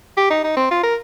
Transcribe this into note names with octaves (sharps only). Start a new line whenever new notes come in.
G4
D#4
D#4
C4
F4
A#4